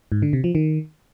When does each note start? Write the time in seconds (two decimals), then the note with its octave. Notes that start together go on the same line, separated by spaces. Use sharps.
0.12 G#2
0.22 D3
0.33 C3
0.44 F3
0.55 D#3